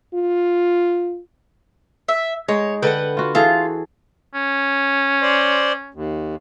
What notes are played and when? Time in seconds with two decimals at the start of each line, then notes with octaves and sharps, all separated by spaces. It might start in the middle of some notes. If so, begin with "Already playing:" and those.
0.14 F4
2.08 E5
2.48 G#3 D#4 C#5
2.82 D3 B4 F#5 G5
3.17 F4 F#4
3.35 E3 F4 G#4 A4
4.34 C#4
5.22 C5 D5 C6
5.94 D#2